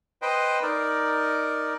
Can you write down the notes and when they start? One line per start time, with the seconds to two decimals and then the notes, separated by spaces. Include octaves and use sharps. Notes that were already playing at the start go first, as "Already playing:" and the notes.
0.22 B4 C5 D#5 G5
0.63 D#4 A#4 D5